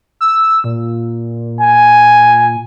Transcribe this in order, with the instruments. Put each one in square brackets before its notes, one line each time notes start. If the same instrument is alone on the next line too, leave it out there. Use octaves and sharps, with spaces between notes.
[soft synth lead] E6
A#2
[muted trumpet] G#5